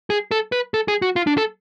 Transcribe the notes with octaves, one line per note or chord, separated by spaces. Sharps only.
G#4
A4
B4
A4
G#4
F#4
F4
D4
A4